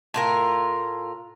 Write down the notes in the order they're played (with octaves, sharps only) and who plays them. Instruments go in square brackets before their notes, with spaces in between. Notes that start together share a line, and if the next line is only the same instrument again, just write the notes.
[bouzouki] A2 F4 A#4